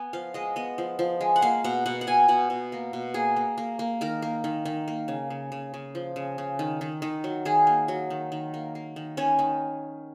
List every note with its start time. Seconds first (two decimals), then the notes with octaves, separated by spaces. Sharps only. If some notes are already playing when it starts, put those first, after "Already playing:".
Already playing: B3 G#5
0.13 F3 F5
0.34 G#3 D#5
0.56 B3 D#5
0.78 F3
0.99 F3
1.21 G#3
1.36 F#5
1.42 A#3 F5
1.64 B2 F#5
1.86 B2 F#5
2.01 F#5
2.07 B2 G#5
2.28 B2 F#5
2.50 B2
2.72 A#3
2.93 B2
3.14 A#3 G#4
3.36 A#3
3.58 A#3
3.79 A#3
4.01 D#3 A#4
4.22 A#3
4.44 D#3
4.65 D#3
4.88 A#3
5.08 C#3
5.30 C#3
5.52 C#3
5.74 C#3
5.95 F3
6.16 C#3
6.38 C#3
6.59 D#3
6.81 D#3
7.02 D#3
7.24 F#3
7.45 D#3 G#4
7.67 A#3
7.88 F#3
8.10 D#3
8.32 D#3
8.54 A#3
8.75 A#3
8.96 D#3
9.17 D#3 C#4
9.39 D#3